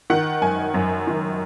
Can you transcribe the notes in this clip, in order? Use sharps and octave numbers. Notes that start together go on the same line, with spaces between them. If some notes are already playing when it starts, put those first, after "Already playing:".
D#3 F#5
F#2 G#5
F#2
D#3